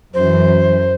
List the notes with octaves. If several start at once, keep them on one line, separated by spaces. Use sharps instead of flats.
F#2 E3 C5